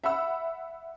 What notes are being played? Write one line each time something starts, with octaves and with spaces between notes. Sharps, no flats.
E5 F#5 B5 E6